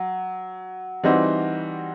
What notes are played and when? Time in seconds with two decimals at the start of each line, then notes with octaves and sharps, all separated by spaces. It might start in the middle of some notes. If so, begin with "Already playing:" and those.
Already playing: F#3
1.04 E3 G3 C4 D#4 F#4